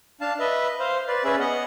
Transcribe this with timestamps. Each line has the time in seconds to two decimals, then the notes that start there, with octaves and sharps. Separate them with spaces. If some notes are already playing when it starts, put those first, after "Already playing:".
0.21 D4 F5 A5
0.40 B4 D#5 E5
0.80 C5 F5
1.08 B4 D5
1.25 C#4 G#4 B4 E5
1.40 B3 D#5 F#5